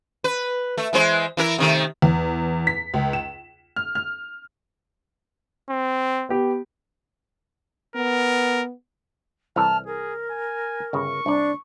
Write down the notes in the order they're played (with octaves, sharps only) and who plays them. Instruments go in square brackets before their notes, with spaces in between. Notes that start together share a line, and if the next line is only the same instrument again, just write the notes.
[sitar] B4
A3
E3 G#3 C5
E3 E4 A#4
C3 D#3 A3
[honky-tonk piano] E2
B6
C#2
E7
F6
F6
[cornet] C4
[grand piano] B3 G4
[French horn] B3 [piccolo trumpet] A#4
[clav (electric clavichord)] C2 E3 A4 [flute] A5 [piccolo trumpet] F6
[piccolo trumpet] G#4 [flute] A#4
[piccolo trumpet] G#5
[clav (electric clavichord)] G1 C#3 [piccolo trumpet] C#6
[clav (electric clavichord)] C2 D5 [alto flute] D4